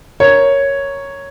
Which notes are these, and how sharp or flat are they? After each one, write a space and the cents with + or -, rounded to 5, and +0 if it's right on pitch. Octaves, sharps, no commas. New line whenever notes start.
A#4 +0 C#5 +0